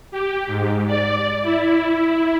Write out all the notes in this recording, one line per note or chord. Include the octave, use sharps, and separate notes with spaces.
G4
G#2
D5
E4